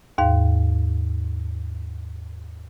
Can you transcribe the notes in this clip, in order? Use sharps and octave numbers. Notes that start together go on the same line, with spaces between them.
D#2 G#2 F5